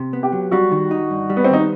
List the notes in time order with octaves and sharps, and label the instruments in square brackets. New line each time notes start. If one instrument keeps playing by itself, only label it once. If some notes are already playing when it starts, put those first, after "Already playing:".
Already playing: [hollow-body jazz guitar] C3
B3
[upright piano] G4
[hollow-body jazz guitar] F#3
[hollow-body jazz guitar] G3 [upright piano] F#4
[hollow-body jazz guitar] D#3
D#4
G2
G3
[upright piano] B3
C4
[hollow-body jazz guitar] D#3 [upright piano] D#4